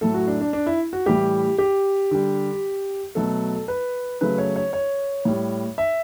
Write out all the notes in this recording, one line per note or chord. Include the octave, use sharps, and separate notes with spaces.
A2 F#3 A3 A4
F#4
D4
D4
D4
E4
F#4
A2 E3 G3 G4
G4
D3 G3
B2 F#3 A3 A4
B4
C#3 F#3 A3 B4
C#5
C#5
C#5
A2 G3
E5